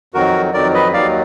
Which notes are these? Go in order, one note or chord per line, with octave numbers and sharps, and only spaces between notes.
F2 D#3 F#3 F#4 A#4
F2 D#3 F#3 A#4 D5
B4 D#5
D#2 D#3 F#3 D5 F5